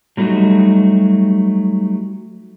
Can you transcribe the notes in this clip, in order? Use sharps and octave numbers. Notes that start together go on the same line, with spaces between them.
F#3 G3 A3 C#4 D#4 F#4